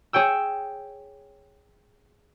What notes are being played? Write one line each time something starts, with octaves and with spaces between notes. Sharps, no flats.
G#4 C#5 G5 E6